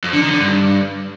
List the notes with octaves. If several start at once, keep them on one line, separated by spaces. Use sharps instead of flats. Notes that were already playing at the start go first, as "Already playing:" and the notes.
F2
D3
D#3
D3
G2